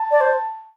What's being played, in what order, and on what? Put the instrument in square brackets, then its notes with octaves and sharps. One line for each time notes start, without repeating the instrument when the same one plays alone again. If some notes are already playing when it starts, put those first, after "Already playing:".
Already playing: [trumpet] A5
[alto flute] D5
C5